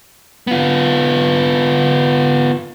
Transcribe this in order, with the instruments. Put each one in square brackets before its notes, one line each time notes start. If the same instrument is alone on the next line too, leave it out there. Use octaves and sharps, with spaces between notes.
[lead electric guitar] B3 F4